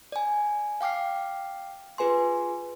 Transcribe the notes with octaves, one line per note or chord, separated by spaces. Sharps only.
D5 G#5
F5 G5 D6 F6 C7
F4 G#4 B4 G#5 C6